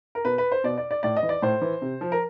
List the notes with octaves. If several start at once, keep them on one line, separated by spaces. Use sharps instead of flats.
A#4
B2 B4
B4
C5
B2 D5
D5
D5
A2 D5
D#5
E3
D5
A2 C5
E3
C3
F3
A#4